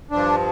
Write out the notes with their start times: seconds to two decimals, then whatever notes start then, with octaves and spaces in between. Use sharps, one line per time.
0.11 G2 F3 D4